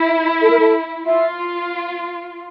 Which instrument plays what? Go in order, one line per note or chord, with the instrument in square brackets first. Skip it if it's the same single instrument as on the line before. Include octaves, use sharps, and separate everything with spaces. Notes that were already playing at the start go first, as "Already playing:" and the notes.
Already playing: [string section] E4
[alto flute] A4
A#4
A4
[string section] F4 [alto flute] E5